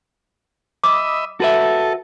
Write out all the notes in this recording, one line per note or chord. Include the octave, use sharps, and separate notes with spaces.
D#5 E5 B5 D6
F#4 A4 B4 E5